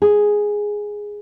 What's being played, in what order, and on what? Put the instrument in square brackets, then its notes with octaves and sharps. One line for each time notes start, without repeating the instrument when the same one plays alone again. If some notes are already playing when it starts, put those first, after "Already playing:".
[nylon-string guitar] G#4